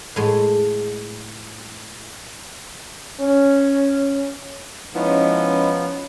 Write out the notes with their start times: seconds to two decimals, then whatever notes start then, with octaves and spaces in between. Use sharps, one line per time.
0.16 A2 G#3
3.20 C#4
4.94 F3 G#3 B3 C#4 D#4 E4 B4 C#5